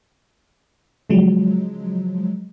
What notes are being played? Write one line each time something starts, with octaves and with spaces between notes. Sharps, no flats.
C#3 F3 F#3 G#3